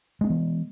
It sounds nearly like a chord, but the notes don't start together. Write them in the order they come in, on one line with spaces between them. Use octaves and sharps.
G#3 D4 B3 E3